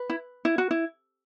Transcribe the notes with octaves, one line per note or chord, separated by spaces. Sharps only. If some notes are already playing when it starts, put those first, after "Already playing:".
Already playing: B4
E4
E4
F#4
E4